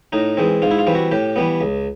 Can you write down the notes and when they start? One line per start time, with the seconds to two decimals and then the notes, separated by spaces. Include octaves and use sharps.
0.13 A2 D#4
0.37 E3 G#3 C4
0.62 G#2 F4
0.71 E4
0.79 F4
0.87 E3 G3 C4
0.95 F#4
1.12 A2 G4
1.36 E3 G3 B3
1.61 C#2